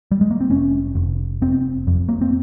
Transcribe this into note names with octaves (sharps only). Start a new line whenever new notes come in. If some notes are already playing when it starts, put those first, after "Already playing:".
G3
G#3
A#3
C4
F1 C#4
F1
F1 C4
F2
A#3
C4